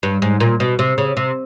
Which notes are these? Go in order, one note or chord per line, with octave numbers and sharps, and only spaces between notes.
G2
G#2
A#2
B2
C3
C#3
C3